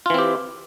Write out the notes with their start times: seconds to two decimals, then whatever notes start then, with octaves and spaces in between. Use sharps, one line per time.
0.06 F4
0.10 E3
0.14 C4
0.19 G4